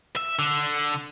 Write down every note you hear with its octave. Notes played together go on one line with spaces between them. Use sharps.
E5
D3